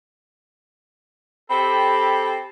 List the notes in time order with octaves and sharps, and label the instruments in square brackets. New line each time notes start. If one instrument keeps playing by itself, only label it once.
[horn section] C4 G4 A4 [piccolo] B5